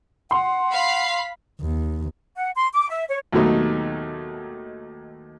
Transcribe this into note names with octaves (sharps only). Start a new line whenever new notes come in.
F#5 C6
F5 B5 C7
D#2
F#5
C6
D6
E5
C#5
D#2 B2 F#3 A3 D#4